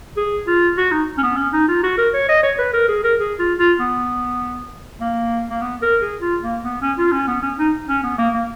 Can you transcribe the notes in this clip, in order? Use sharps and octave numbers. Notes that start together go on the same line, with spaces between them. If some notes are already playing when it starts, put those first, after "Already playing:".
G#4
F4
F#4
D#4
C#4
B3
C#4
D#4
F4
F#4
A#4
C#5
D#5
C#5
B4
A#4
G#4
A#4
G#4
F4
F4
B3
A#3
A#3
B3
A#4
G#4
F4
A#3
B3
C#4
F4
C#4
B3
C#4
D#4
C#4
B3
A#3
A#3